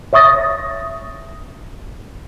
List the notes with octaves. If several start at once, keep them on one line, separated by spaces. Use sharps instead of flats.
C#5 E5 C#6 D#6 A6 A#6